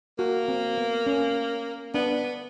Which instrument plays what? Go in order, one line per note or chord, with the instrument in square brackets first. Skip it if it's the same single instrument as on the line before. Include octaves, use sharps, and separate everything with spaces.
[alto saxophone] A#3 [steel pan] F#4
[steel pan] C4
B3
C#4
[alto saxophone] B3 [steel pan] D4